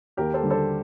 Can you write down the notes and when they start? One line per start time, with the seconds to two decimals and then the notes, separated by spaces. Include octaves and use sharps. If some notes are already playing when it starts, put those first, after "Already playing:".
0.17 D#2 G4 A#4
0.34 A4 C5
0.42 D3 G3
0.50 A4 C5